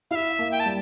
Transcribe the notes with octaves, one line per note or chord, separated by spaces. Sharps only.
E4 E5 F5
A#3
G5
A5
G3